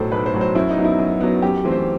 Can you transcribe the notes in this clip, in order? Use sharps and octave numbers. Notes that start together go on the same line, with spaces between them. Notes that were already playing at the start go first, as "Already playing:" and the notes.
Already playing: B1 A2 F#3 A4 C5
B1 B4
C5
A2 F#3
C5
F#2 E4
D#4
F#3 B3
E4
F#2
F#3 B3
F#2 G4
E3 A3 C4
C5